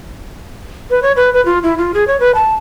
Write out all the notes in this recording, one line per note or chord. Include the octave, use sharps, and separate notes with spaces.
B4
C#5
B4
B4
F4
E4
F4
G#4
C#5
B4
A5